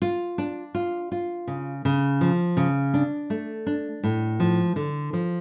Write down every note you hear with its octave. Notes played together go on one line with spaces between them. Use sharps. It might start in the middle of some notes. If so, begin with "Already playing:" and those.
F4
D4
F4
F4
C#3
C#3
F3
C#3
D4
A3
D4
A2
F3
D3
F3